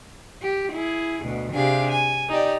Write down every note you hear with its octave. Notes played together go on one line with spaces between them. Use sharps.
G4
E4 G#4
D2 B2
C3 D4 G4 G#4 F5
G#5
D#4 G4 D5